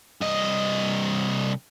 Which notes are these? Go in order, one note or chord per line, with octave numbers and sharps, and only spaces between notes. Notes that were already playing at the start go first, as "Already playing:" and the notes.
C2 D#5